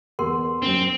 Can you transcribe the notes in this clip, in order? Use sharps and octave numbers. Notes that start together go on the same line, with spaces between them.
E2 A#4 F#5 C6
F#2 C4 C#4